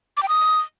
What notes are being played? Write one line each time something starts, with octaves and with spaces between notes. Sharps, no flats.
D6
G5
D#6